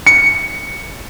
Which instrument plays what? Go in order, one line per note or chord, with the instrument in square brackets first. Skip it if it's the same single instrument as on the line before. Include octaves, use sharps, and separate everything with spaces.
[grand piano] C#7